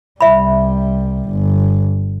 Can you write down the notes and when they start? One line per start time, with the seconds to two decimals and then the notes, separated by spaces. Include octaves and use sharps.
0.21 C2 G3 E5 B5
1.29 G1